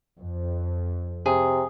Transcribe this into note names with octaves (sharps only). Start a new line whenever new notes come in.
F2
C3 G#4